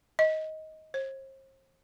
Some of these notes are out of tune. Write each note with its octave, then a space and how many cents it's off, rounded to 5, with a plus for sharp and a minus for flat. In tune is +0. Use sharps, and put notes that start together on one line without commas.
D#5 +15
C5 +40